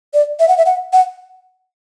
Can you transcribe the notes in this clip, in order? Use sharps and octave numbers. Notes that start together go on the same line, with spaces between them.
D5
E5
F#5
E5
F#5
F#5